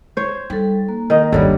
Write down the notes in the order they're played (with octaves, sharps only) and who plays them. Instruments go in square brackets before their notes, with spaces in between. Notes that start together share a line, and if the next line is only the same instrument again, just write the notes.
[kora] C5 C#5
[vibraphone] G3 A4 [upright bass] D#4
[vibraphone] A#3
[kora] D#3 D#5
[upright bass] G1 D#2 [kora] D3 G3 [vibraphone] C#5